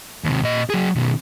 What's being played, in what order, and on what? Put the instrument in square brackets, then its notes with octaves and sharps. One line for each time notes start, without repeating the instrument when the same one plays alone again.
[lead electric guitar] D#2 C3
A#2 D#5
F#3 G#4
B2 D#3